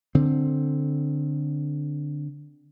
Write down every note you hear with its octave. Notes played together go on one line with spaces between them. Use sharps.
D3 C4